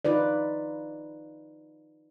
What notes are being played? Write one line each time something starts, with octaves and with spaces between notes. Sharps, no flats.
D#4 F4 B4 D5